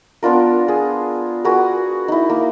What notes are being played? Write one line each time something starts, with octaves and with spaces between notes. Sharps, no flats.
B3 D4 F4 A#4
G#4
F#4 G#4 A#4 B4
D#4 E4
A#3